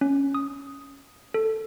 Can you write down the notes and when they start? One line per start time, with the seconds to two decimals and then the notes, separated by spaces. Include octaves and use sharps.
0.01 C#4
0.35 D#6
1.34 A4